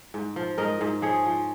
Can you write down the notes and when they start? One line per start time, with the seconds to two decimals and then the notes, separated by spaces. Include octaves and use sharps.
0.14 G#2
0.36 F3
0.58 G#2 A#4 D#5
0.81 G#2
1.02 F3 G#4 C#5
1.26 F3